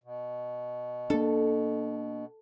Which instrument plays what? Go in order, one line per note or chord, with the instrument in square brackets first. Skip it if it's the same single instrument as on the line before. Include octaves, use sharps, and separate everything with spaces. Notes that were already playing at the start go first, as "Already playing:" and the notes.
[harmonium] B2
[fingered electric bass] A#3 D4 [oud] A4